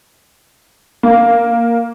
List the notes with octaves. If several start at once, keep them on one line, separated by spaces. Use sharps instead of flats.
A#3